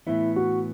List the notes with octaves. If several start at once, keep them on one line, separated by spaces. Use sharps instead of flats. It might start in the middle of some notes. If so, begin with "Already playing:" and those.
A2 E3 B3 E4
F#4